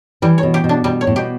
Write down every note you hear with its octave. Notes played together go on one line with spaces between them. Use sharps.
E3 G3
C#5
B2
G4
B2
D4
B2 G3
C#5
A2
B2 G4